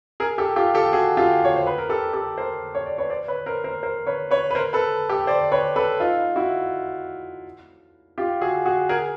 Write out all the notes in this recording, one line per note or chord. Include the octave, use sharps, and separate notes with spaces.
G#4 A#4
G4 A4
F4 G4
G4 A4
F#4 G#4
F4 G4
C#5
C5
B4
A#4
G4 A4
G4 A4
A#4 C5
C#5
D5
B4 C#5
C5 D5
B4 C#5
A#4 C5
A#4 C5
A#4 C5
B4 C#5
B4 C#5
B4
A#4 C5
A4 B4
G4 A4
C5 D5
B4 C#5
A4 B4
D#4 F4
E4 F#4
F4 G4
F#4 G#4
F#4 G#4
G#4 A#4